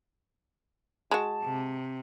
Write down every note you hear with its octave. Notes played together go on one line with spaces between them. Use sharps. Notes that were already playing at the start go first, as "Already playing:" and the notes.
G#3 F#4 A5
C3